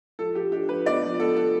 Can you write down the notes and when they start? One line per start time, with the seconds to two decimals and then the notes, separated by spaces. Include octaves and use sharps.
0.19 F3 A4
0.35 F3 G4
0.52 D4 G4
0.69 F3 B4
0.86 B3 D5
1.03 F3
1.20 B3 A4
1.36 F3 A4